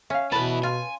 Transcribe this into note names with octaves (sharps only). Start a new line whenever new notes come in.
C#4 E5 F5
B2 B3 E4 B4 A5 B5
F4 G#5